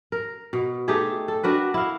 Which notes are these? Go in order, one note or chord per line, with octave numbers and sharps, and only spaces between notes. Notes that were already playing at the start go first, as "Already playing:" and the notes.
A#4
B2
A3 D#4 G4 G#4
A4
D4 F#4 A#4 B4
E4 F5